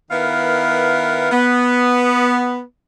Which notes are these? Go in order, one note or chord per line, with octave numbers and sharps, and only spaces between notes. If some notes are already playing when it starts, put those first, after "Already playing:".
D#3 B3 E4 A#4 B4 F5
B3